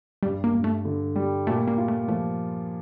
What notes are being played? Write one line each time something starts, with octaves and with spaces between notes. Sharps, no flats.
G2 G3
A#3
G2
A3
D3
G3
A#2 A3
A#3
F4
A3
F3 A3